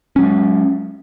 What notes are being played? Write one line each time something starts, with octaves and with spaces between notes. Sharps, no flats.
F#3 G#3 C#4